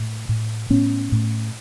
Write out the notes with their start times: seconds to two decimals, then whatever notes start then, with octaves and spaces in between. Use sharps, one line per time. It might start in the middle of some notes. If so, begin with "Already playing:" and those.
Already playing: A2
0.29 A2
0.70 A2 B3 C#4
1.12 A2